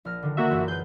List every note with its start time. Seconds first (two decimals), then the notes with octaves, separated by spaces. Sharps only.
0.05 A#1 F6 A#6
0.22 D3 D#3
0.37 A#3 F#4 E5
0.50 F#2 E3 F4
0.68 G#4 B4 G6